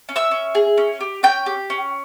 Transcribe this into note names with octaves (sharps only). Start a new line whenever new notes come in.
C#4
E5 E6
C#4
G#4
C#4
G4
C#4 G5 G6
G4
C#4